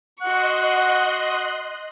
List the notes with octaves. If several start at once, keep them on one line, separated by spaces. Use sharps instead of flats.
F#4 D#5 F#5 C6 C#6 F#6